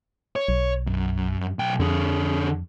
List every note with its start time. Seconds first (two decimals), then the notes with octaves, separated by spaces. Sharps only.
0.36 C#5
0.48 B1
0.87 F#2
1.59 B1 G5
1.79 F2 D3 G#4